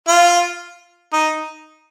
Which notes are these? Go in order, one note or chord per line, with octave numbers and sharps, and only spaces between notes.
F4
D#4